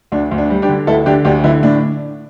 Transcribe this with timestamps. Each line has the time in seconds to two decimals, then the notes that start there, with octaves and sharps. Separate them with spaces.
0.12 D2 D4
0.31 D2
0.38 D4
0.50 G3
0.62 D4 G4
0.69 D3
0.87 D2 E4 A4
1.06 D3 D4 G4
1.25 D2 D4 G4
1.44 D3 E4
1.63 A2 D4